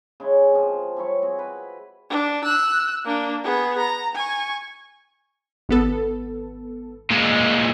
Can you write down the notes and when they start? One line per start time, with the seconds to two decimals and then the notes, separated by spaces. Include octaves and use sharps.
0.20 C#3 G#3 E4
0.51 F3 C4
0.97 G3 E4 C#5 C#6
1.22 C4 F#4 G#4
1.39 B4
2.10 D4
2.44 E6 F#6
3.05 A#3 D4
3.44 B3 G#4
3.78 A#5
4.15 G#5 C#6
5.69 G#1 B3 A4
7.10 A#2 G#3